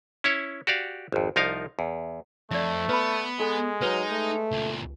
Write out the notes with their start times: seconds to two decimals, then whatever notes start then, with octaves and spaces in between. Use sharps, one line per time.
0.24 C#4 E4 C#5
0.67 F#4 G4 D5 F5
1.12 G#1 F2
1.36 C2 F3 D#4 A#4 F5
1.79 E2
2.51 F2 A3 D5 E5
2.89 B3 B4 B5
3.40 G#3 A4 G#5
3.82 F#3 D#4 B4
4.12 A3
4.51 C#2 A#2